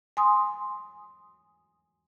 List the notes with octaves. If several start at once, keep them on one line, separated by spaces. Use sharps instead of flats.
G#5 C6 D#6